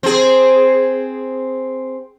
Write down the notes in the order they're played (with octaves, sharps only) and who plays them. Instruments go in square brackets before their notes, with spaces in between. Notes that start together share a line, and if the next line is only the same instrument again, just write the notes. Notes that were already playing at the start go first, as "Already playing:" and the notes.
[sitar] C4 G#4